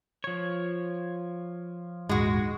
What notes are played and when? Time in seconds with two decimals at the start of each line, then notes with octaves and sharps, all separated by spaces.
0.24 F3 C#5
2.09 D#1 G#2 G#3 F#4